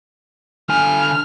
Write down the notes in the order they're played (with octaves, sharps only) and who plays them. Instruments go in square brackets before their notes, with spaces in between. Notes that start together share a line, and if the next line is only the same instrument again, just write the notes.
[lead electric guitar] D3 G#5 [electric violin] F6